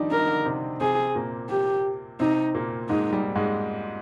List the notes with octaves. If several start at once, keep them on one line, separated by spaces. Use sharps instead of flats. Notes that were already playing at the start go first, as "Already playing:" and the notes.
Already playing: D#3 F3 G3 D4 D#4 F4
D4 A#4
D#4
D3 D4
C3 C4
C3 C4 G#4
A#2 A#3
G4
C3 C4 D#4
A#2 A#3
G#2 G#3 D#4
G3
G#2 G#3